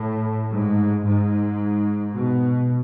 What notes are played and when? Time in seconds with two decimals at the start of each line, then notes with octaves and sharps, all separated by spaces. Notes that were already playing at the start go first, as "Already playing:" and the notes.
Already playing: A2
0.50 G#2
1.05 G#2
2.14 B2